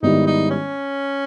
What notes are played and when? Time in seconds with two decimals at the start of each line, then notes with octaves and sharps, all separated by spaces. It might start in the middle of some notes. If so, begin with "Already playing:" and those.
0.02 G#2 D#3 G3 B3 D#4 E4
0.27 D#4
0.50 C#4